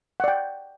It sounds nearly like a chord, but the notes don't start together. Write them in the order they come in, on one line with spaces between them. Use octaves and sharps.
F#5 D5 G5